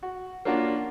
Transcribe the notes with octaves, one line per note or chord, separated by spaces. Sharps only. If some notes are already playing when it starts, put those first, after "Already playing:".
F#4
A#3 C#4 D4 F4 F#4